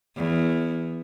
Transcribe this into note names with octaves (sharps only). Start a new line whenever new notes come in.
E2